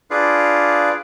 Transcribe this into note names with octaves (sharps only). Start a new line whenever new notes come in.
D4 F4 G#4 B4 D5 F5